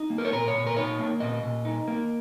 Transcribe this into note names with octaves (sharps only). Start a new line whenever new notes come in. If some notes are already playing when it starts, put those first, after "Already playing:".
Already playing: D#4
A#3
A#4
C#5
A#2 A#4
C#5
A#2
A#4
D#4 C#5
A#3
A#2 D#5
A#2
D#4
A#3